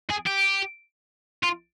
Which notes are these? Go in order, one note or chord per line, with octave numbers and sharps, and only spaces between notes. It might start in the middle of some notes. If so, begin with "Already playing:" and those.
G#4
G4
F4